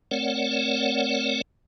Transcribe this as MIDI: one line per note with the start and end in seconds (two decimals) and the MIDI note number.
0.11 1.41 57
0.11 1.41 60
0.11 1.41 70
0.11 1.41 73
0.11 1.41 74
0.11 1.41 78